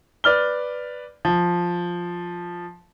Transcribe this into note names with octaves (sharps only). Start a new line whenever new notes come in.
B4 D5 F6 G7
F3